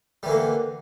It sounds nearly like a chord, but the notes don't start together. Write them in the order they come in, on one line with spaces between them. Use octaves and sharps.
G3 E3 D3 A#3